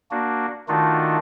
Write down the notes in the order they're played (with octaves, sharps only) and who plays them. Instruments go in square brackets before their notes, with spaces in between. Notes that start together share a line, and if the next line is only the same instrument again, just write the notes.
[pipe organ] A#3 D4 F#4
D#3 A3 D4 D#4 F4 F#4